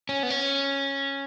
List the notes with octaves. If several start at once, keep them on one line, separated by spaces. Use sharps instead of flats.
C#4
B3
C#4